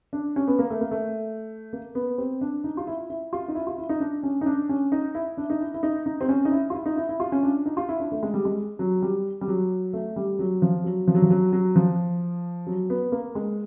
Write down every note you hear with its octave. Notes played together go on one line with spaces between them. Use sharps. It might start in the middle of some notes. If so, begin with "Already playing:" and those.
D4
C#4
B3
A#3
A3
A#3
A3
A#3
B3
C4
D4
D#4
F4
E4
E4
F4
D#4
E4
F4
E4
D#4
D4
C#4
D#4
D4
C#4
D#4
E4
D4
D#4
E4
E4
D#4
D#4
C4
C#4
D#4
E4
F4
E4
D#4
E4
E4
F4
C#4
D4
D#4
F4
E4
D4
A3
G#3
G3
G#3
F#3
G3
G3
F#3
A3
G3
F#3
F3
F#3
F3
F#3
F3
F#3
F#3
F3
F#3
B3
A#3
G#3